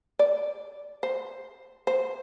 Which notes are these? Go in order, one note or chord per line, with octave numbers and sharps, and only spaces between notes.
D5
C5
C5